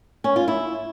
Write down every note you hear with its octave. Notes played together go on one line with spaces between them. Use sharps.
C#4
F4
E4